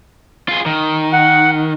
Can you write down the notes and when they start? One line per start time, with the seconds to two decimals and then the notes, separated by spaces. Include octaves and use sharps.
0.49 F4 G#4
0.66 D#3
1.13 F#5